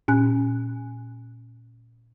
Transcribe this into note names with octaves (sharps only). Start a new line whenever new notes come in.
A#2 C#4 G#5 F#6